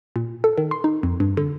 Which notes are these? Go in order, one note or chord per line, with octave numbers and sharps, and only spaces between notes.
A#2
A4
D#3
C6
D#4
F2
G2
D3